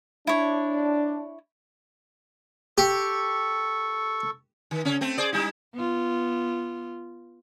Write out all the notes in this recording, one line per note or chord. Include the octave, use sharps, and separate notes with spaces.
D4 E4 C#5
G4 A4 C#6
D#3
C#3 C#4
A3 C4
G#4 C5 D5
G3 D#4 E4
B3 F4